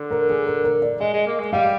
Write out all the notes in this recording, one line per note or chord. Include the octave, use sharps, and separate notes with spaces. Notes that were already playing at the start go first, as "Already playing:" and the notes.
Already playing: D3
A#4
G#4
A#4
A#4
D5
G#3 D#5
G#3
A#3
G#3
G3 F5